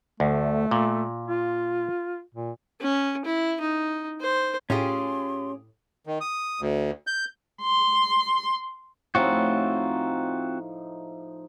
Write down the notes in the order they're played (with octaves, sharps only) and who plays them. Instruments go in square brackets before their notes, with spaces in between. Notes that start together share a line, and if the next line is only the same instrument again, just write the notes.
[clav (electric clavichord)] D2 [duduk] A3
[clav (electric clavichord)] A#2
[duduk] F4
A#2
[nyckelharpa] C#4
E4
D#4
C5
[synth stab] A2 [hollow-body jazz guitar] C#4 [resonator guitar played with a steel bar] F4 G4 G#4 [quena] C6
[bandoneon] D#3
D#6
D2
G6
[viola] C6
[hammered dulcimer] A2 F3 D#4 [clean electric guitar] C4 F4 F#4